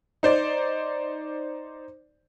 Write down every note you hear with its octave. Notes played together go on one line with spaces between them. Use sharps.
D#4 C5 D5